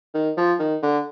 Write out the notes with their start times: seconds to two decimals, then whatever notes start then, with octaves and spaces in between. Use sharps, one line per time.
0.14 D#3
0.37 F3
0.59 D#3
0.83 D3